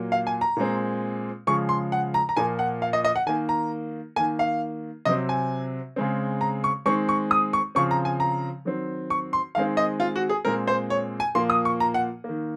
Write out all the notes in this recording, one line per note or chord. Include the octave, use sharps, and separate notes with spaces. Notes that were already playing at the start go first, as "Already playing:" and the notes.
Already playing: A#2 F#3 A#3
F5
G#5
A#5
A#2 G#3 C4
C#3 F3 G#3 C#6
C6
F#5
A#5
A#5
A#2 F3 A#3 G#5
F#5
F5
D#5
D#5
F#5
D#3 A#3 G#5
A#5
D#3 A#3 G#5
F5
C3 F#3 C4 D#5
G#5
C#3 G#3 C4
A#5
C#6
D#3 G#3 C4 C#6
C#6
D#6
C#6
C#3 F3 C4 C#6
A#5
G#5
A#5
D#3 F#3 C4
C#6
C6
D#3 G#3 C4 F5
D#5
F4
F#4
G#4
A#2 G#3 C4 A#4
C5
C#5
G#5
A#2 F3 A#3 C6
D#6
C#6
A#5
F#5
D#3 A#3